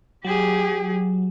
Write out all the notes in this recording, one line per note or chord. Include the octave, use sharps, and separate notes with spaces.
F#3 G4 G#4